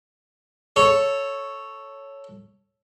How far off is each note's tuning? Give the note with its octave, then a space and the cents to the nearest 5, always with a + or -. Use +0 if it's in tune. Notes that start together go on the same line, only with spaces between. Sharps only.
A4 +0 C#5 +0